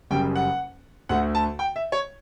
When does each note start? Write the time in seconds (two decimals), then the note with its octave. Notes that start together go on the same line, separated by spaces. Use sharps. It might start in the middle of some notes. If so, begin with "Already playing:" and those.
0.10 F#1 F#2 C#3 G3 G5
0.36 F#5
1.09 D2 D3 A3 F#5
1.35 A5
1.59 G5
1.76 E5
1.92 C#5